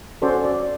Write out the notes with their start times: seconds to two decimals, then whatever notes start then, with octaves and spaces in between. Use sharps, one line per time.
0.22 C#4 F#4 A4 C5 D5
0.44 D5